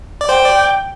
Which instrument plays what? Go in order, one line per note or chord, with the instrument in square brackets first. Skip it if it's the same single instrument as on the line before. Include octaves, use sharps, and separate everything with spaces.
[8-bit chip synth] D5
[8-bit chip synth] C5 [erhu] G5
[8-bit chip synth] D5